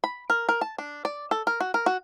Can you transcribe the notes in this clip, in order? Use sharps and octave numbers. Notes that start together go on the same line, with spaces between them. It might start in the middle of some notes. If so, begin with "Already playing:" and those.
B5
A#4
A#4
A5
D4
D5
A4
A#4
F#4
A#4
F#4